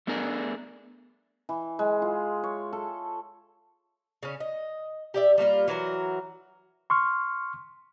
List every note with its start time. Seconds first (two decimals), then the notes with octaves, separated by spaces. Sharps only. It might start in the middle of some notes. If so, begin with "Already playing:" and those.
0.07 A3 B3 D4 G#4 A#4
1.49 E3
1.79 G#3
2.02 F4
2.44 C#5
2.73 A4
4.23 C#3 C#4
4.40 D#5
5.14 G4 D5 E5
5.38 G3 A3 A#3 F4
5.68 E3 F#3 F#4 A#4
6.90 C6 C#6 F6